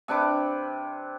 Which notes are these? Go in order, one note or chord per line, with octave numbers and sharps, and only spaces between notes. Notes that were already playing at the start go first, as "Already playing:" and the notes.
C3 D4 B4 D6